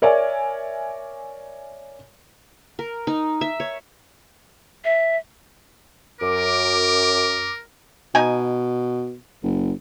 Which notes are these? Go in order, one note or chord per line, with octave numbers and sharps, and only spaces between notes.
A#4 C#5 D5 E5 G#5
A#4
D#4
E5
C#5
E5
F#2 A#4 D6
B2 D#4 G#5
F#1